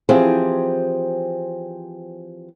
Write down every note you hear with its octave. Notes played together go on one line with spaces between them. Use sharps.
E3 F3 C4 G4 G#4